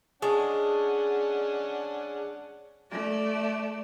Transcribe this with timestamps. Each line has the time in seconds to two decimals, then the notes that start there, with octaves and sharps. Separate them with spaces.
0.22 G#3 C#4 D4 G#4 F#5 A5 C#6
2.91 A3 D5